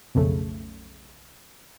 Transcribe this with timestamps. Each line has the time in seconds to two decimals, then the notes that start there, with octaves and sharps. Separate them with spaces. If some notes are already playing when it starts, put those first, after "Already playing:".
0.15 B1 F2 C#3 A3